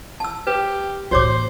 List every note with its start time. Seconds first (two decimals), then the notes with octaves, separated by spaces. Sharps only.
0.20 A5 E6
0.47 G4 B4
1.11 A1 A#2 F#4 C5 C#5 D6